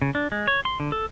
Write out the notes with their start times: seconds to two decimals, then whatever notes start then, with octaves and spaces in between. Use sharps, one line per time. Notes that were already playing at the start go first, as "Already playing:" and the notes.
0.02 C#3
0.15 D4
0.32 G#3
0.47 C#5
0.65 C6
0.80 D3
0.92 A4